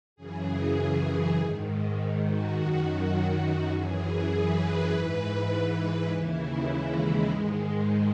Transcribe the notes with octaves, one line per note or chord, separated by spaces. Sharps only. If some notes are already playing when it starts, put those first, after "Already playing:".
F#2 C#3 E3 G#4
G#2 D#3
F#4
F#2 D#3
F#2 E3 G#4
B4
G#2 E3
B4
D#2 C#3 E3 E4
G#3
G#3
G#2 D#3